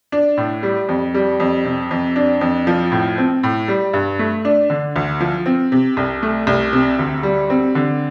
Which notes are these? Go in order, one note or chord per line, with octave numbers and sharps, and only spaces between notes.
D4
A2
G3
F2
G3
F2
C3
F2
D4
F2
F3
A2
C4
A2
G3
G2
A3
D4
D3
D2
F3
C4
C3
C2
A3
C2
C3
D2
G3
C4
D3